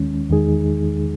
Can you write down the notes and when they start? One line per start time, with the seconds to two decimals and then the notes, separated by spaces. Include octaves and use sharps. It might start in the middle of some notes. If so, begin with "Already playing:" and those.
Already playing: D#2 D#3 G#3 C#4
0.30 E2 D#3 G#3 D#4 G#4